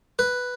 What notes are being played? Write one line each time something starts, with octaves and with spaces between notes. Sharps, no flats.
B4